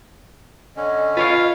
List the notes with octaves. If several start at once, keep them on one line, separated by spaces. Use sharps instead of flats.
D3 C#4 D#5
F4 B4 C#5 F5